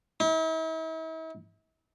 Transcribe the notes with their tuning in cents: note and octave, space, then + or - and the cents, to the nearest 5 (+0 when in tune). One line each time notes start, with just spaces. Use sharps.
E4 -45